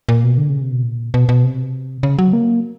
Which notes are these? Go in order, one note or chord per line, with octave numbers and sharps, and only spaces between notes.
A#2
B2
D3
C#3
C3
B2
A#2
B2
B2
C3
C#3
F#3
A#3